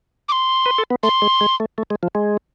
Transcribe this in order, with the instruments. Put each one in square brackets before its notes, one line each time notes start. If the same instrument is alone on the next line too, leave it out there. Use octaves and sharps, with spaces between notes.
[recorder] D6
C6
[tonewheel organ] B4
A4
B3
[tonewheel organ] A3 [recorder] C6
[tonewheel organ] G#3
G#3
A3
A3
G#3
F3
G#3